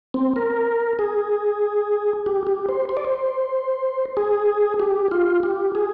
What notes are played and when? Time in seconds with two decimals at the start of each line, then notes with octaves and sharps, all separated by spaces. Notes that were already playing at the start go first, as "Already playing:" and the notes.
0.14 C4
0.36 A#4
0.99 G#4
2.26 G4
2.47 G4
2.69 C5
2.89 C5
2.97 D5
3.05 C5
4.17 G#4
4.80 G4
5.11 F4
5.43 G4
5.75 G#4